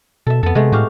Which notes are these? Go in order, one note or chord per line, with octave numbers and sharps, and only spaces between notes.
B2 A4 E5
F2 B3 A4
C3 G#3 A3
A2 F#4 G4 F5